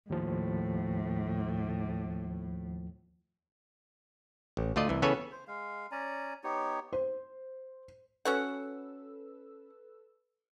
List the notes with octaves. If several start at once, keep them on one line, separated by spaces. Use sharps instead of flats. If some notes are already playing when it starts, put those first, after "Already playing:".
D#2 A2 F3
A1
D2 A3 F4 D5 D#5
C2 E3
C#3 E3 B3 A4 C#5 G#5
C5
G#3 F5
C#4 D5 G#5 A#5
B3 D#4 G4 C#5
C5
C#4 F#4 A4 B4 F#5 E6